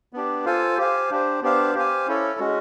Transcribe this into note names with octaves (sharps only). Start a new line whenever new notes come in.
B3 D4 G4
F4 A4 C5 F5 G#5
G4 C5 F5 G#5
D4 G4 C5
B3 D4 G4 C5 F5
G4 C5 F5 G#5
C#4 E4 A4 C#5
G#3 C#4 F#4